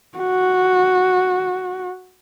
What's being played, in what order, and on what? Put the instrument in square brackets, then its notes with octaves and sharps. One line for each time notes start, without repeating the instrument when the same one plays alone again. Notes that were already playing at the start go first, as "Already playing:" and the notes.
[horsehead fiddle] F#4